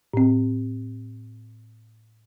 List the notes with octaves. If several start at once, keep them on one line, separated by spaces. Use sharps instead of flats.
A2 C4